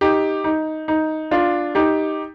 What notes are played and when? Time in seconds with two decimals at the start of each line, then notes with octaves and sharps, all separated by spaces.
0.01 D#4 G4
0.44 D#4
0.88 D#4
1.31 D4 F4
1.75 D#4 G4